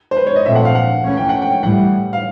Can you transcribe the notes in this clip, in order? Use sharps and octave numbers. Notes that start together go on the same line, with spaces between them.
C5
B4
C#5
D#5
A#2 F3 A3 C4 E5
F#5
F5
F#5
E3 A3 C#4
G5
F#5
G5
A2 E3 G3 F#5
F5